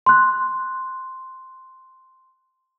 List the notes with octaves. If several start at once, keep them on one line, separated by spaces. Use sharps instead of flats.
C6 F#6